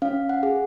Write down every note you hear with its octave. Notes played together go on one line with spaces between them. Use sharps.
C#4 F5
F#5
G#4